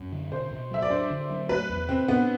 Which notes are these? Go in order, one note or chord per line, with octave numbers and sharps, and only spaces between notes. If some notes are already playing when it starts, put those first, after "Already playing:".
Already playing: F#2
D3
B2 C5
B2
F#3 E5
D5
D4 C5
D3
F#3
A3 B4
E2
C3 C4
B3 D4